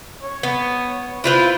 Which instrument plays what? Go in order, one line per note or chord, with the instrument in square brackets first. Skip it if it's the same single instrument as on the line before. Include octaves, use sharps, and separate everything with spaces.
[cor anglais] C#5
[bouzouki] B3
[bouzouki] E4 F4 B4 [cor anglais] C5